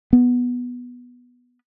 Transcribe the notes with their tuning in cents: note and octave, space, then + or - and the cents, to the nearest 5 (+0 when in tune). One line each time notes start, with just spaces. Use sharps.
B3 -5